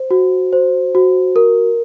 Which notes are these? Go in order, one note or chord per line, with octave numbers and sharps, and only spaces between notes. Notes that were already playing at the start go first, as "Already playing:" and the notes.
Already playing: C5
F#4
C5
F#4
A#4